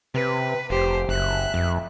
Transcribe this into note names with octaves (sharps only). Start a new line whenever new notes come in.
C3 B4
F1 G4 C5
F#1 E5 F#6
F2